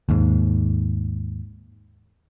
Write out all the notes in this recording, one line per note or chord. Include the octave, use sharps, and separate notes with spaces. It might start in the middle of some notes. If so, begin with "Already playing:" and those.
D#2 G#2